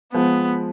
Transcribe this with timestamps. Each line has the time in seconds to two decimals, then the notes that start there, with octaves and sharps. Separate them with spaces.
0.14 F3 G#3 B3